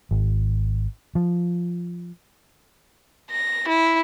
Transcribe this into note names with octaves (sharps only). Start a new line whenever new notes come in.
G#1
F3
A#6
E4